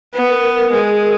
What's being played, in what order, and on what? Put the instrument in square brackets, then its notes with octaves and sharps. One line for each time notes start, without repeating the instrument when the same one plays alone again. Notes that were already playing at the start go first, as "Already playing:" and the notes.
[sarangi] B3 [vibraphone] B4
[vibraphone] A#4
B4
A#4
[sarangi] G#3 [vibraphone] G#4
[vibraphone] A#4